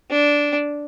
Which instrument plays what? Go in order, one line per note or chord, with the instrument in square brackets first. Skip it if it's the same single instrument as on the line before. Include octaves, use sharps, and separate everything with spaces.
[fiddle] D4